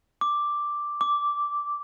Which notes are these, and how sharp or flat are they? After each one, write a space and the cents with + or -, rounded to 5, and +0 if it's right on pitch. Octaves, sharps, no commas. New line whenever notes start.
D6 +0
D6 -10